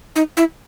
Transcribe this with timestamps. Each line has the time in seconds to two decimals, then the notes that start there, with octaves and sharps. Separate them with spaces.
0.16 D#4
0.37 E4